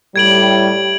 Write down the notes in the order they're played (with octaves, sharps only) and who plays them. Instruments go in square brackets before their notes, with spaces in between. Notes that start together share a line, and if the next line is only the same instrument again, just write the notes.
[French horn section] A2 G3 [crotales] G#6 D7 F#7